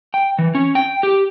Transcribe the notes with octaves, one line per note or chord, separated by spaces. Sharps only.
G5
E3
C#4
G5
G4